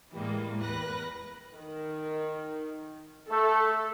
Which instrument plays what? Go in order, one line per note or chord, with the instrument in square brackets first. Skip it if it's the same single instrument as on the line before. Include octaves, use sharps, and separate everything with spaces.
[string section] A2 E3 G3 G#3 A#3
E2 A#4 B4 F#6 A#6
[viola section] D#3
[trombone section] A3 [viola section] A4